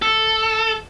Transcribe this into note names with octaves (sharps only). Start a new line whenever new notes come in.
A4